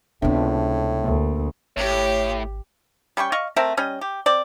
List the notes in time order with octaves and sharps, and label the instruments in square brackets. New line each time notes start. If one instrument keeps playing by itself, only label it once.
[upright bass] C#2 C3 [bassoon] A2 [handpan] B3 D4
[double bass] D2 [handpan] A#3
[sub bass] G#1 [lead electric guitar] A2 [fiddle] G4 [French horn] C#5
[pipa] G3 C#4 G5 C#6
D5 D#5 F5 C#6
A3 C4 A#4 E5
G3 C#4 D#5
G4
C4 D5